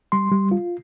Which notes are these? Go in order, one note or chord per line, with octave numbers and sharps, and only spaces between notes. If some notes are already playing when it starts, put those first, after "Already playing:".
G3 C6
G3
F4